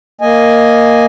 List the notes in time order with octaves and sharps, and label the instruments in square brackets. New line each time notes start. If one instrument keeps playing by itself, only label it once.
[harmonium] A#3 D#5 G#5